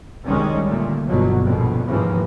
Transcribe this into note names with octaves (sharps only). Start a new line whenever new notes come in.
C2 F#2 D#3 G3 G#3 C#4
A#2 D3 A3
G1 B2 F#3 A#3
A#1 F2 B2
D#2 G#2 C#3 E3 F3 A#3